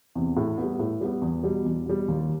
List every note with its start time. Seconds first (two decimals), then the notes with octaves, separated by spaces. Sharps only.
0.15 E2 C3
0.37 A2
0.58 G3 B3
0.79 A2
1.01 G3 B3
1.22 E2
1.43 B2 G3
1.65 E2
1.86 B2 G3
2.08 D#2